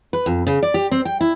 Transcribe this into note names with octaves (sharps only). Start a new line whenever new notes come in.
B4
F2
C#3
D5
G4
C4
G5
E4